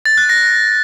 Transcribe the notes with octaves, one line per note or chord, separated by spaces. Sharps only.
A6
F#6
A#6